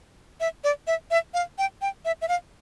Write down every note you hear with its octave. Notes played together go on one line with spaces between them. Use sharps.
E5
D5
E5
E5
F5
G5
G5
E5
E5
F5